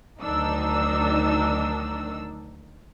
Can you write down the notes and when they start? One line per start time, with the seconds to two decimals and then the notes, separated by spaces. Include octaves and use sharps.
0.22 D2 D#3 F#3 D4 D#4 E6